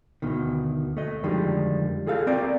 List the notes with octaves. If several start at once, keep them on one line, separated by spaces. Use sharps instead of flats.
D2 B2 D#3
A3 D#5
F2 D3 D#3 G3 G#3
F4 G#4 A4 F5
C4 A#4 D5